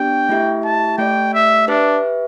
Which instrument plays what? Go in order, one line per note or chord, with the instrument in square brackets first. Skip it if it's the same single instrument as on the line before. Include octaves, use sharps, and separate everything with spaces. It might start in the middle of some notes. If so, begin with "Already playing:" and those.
Already playing: [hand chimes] B3 D4 G4 D5 [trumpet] G5
[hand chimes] A3 E4 G4 E5
[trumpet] A5
[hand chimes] A3 G4 D5 [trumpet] G5
[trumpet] E5
[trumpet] D4 [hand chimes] G4 B4 E5